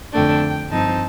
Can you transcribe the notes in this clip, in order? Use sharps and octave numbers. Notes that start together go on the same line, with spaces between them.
F2 D3 A3 D4 G5
G2 F3 C4 D#4 A5